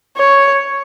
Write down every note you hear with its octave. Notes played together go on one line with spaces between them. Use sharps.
C#5